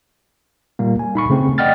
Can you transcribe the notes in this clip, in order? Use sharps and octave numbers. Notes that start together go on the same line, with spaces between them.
A#2 G3 A#3
G#5
D#4 B5 C#6
C#3 A3 C4
D5 D#5 F#5 G5 F6 A6